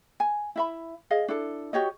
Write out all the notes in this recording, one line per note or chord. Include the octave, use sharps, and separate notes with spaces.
G#5
E4 E5 B5
G#4 D#5 F5
D4 E4 A4
F#4 G4 C#5 D#5